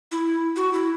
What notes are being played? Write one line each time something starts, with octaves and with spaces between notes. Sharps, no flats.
E4
F#4
E4